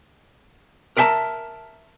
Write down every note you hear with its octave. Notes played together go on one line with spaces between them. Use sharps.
A#4 D5 E5 G5 A5 A#5